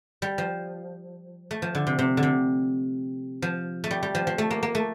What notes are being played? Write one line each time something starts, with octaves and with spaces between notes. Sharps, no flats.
G3
F3
A3
F3
D3
C3
C3
D3
C3
F3
A3
G3
G3
F3
F3
A3
A#3
A#3
A3